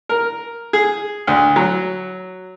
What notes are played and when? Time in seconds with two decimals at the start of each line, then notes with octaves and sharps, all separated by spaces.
0.09 A#4
0.73 G#4
1.27 D2
1.56 F#3